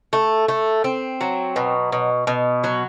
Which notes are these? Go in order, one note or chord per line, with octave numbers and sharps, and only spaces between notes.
A3
A3
C4
F#3
B2
B2
B2
F#3